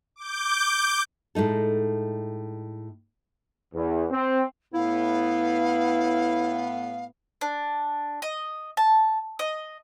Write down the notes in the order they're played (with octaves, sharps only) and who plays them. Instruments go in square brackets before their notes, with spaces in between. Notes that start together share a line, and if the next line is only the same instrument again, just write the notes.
[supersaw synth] D6 G6
[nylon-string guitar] A2 G#3 D#4 A4
[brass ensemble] E2
C4
[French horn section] A2 B3 [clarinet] E4 [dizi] F5
[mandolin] D4
D#5
A5
D#5